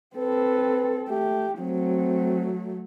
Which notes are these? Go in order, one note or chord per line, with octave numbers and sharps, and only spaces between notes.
C4 A4 B4
A3 G4
F#3 A3 C4